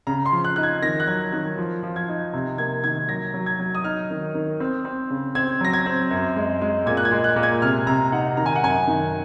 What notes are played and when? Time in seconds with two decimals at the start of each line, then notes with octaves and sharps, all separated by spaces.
0.07 C#3 A#5
0.26 C6
0.32 F3
0.44 F#6
0.56 D#4 F#6
0.63 G#6
0.82 D#3 A#6
1.00 F#6
1.07 F#3 G#6
1.32 D#3 F#6
1.57 F3
1.83 F3
1.96 G#6
2.08 D#4
2.33 C3
2.58 A#3 G#6
2.83 D#3 G#6
3.09 F#3 A#6
3.34 F#3
3.46 G#6
3.59 F#3
3.75 D#6
3.84 D#4 F6
4.10 D#3
4.34 D#3
4.60 C4
4.85 C4
5.10 C#3
5.35 C4 G#6
5.61 F#3 A#6
5.73 G#6
5.86 C4
6.10 F#2
6.36 G#3
6.62 G#3
6.86 A#2 G#6
6.97 F#6
7.05 G#6
7.12 G#3
7.24 F#6
7.36 A#2
7.43 G#6
7.62 C3 F6
7.87 C3 A#5
8.12 D#4 F#5
8.37 D#3 A#5
8.46 G#5
8.56 F#5
8.62 F#2 G#5
8.87 D#3